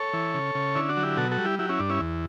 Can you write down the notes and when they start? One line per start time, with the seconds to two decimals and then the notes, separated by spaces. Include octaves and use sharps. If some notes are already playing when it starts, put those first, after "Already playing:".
Already playing: A4 C#5
0.13 E3
0.34 C#3
0.55 C#3
0.75 D3 C#4 E4
0.89 D4 F#4
0.97 F#3
1.03 E4 G4
1.17 B2 F#4 A4
1.31 F#4 A4
1.38 G3
1.45 E4 G4
1.59 F#3 E4 G4
1.69 C#4 E4
1.79 G2 D4
1.90 C#4 E4
2.01 E2